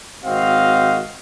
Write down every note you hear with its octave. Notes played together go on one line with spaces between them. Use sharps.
G#1 C4 F#4 D#5 F5